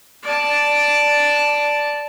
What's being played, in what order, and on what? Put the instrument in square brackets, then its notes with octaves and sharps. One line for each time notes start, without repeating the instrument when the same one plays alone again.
[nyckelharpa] D5 A5